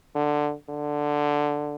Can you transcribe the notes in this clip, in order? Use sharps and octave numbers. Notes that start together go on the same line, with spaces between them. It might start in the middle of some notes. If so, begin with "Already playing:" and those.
D3
D3